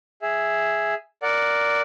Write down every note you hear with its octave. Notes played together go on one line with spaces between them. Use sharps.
G#4 E5
A#4 D5 F#5